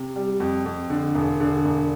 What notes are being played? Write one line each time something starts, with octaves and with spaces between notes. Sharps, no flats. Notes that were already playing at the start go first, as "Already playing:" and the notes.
Already playing: C3
G3
F2
F2
D3
E1
D3
E1